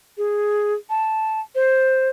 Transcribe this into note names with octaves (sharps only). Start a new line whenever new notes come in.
G#4
A5
C5